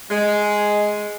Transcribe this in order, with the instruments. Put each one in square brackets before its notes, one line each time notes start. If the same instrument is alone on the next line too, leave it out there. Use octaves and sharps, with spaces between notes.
[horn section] G#3